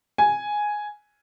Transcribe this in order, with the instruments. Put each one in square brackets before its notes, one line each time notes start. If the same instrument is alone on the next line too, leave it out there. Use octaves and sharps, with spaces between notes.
[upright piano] G#5